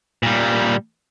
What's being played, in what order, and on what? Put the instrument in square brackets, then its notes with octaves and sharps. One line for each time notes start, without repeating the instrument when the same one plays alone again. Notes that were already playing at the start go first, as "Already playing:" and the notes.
[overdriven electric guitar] A#2 G3